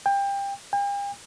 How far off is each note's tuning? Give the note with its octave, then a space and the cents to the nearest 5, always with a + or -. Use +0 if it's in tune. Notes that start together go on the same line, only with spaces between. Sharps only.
G5 +25
G5 +45